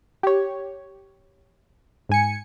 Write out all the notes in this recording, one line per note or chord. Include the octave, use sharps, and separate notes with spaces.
G4 C#5
G#2 G#5 C#7